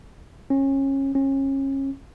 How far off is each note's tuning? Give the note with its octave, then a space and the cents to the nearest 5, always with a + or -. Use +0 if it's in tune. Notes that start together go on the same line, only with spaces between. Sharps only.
C#4 -25
C#4 -30